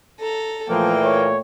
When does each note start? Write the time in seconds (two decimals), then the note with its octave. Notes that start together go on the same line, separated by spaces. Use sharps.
0.20 A4 A#5
0.69 A#2 E3 F3 A3 A#3 G5
1.03 C#5